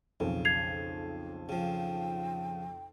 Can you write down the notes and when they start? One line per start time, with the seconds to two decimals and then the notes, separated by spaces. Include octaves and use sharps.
0.20 B1 F2 C#3
0.45 G#6 C7 F7
1.49 C#3 F3 G5